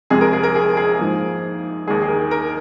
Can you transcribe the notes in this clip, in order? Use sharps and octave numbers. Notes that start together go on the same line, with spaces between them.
F2 C3 G#3 G#4
A#4
G#4
A#4
G#4
G#4
G#2 F3 A#3
D#2 D#3 G#3 G#4
G#4
A#4
A#4